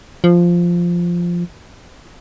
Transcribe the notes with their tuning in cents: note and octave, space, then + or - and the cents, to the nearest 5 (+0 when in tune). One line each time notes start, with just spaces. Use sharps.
F3 -5